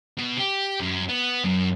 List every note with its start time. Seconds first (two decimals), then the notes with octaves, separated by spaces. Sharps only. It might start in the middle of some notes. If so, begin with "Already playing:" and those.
0.17 B2
0.37 G4
0.80 F#2
1.09 B3
1.44 F#2